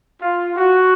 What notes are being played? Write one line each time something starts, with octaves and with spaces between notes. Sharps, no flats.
F4
F#4